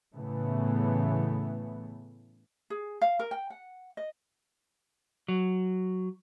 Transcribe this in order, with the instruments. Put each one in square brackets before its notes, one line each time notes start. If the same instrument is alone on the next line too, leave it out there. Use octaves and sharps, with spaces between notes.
[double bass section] A2 C#3 E3 A3 B3
[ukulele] G#4
F5
A#4
G5
F#5
D#5
[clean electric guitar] F#3